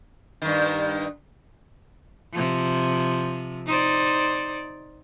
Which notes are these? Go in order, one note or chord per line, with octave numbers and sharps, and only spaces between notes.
G2 D#3
C3 F3
D#4 C5 D5